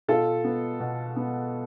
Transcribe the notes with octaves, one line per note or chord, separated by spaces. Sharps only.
B2 F4 A4
B3
B2
B3